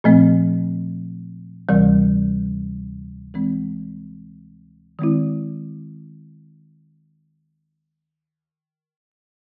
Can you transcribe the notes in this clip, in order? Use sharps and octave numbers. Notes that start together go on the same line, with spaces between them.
A#2 F3 A3 C4
D2 C3 E3 G3
E3 G#3 C4
D#3 G#3 C4 E4